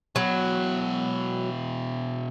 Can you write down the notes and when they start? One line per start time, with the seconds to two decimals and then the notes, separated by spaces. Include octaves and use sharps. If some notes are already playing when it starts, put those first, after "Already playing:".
0.16 B2 F#3 E4